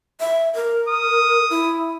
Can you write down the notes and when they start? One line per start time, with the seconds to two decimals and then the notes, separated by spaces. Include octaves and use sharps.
0.20 E5
0.55 A#4
0.89 D#6
1.50 E4